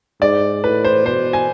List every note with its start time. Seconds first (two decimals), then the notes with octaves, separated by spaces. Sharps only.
0.21 G#2 D5
0.63 A2 B4
0.85 C5
1.05 B2 C5
1.33 G#5